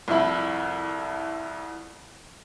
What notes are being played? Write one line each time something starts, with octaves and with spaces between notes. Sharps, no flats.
C2 F2 E4 B5